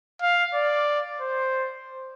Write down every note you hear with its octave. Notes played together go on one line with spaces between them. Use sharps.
F5
D5
C5